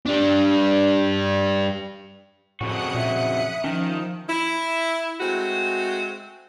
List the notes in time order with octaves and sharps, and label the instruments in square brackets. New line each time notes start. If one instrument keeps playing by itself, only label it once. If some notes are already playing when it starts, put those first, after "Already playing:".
[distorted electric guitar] G3 D4
[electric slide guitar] F2 C#3 F#4 [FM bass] A2 [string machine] D#6 F#6 C#7
[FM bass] A#2 [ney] E5
[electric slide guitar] D#3 [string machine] F3 [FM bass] C#4
[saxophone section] E4
G#3 A3 C4 F#4